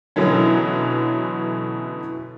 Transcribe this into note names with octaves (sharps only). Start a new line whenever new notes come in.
B2 D3 E3 F#3 C#4